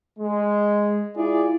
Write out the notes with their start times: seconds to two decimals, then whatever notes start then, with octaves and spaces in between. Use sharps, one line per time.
0.19 G#3
1.16 E4 F4 G#4 D5